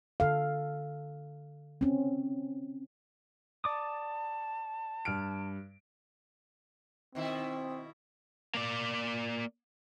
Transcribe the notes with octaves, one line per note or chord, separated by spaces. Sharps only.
D3 A4 F5
C4 C#4
D5 A5 D6 D#6
G2 F6 D7
B2 D#3 C4 E4
A#3 D5